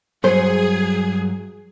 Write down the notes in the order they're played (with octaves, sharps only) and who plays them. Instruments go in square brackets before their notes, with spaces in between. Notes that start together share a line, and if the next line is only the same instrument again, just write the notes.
[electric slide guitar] G2 F#3 [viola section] G#4 [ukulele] C5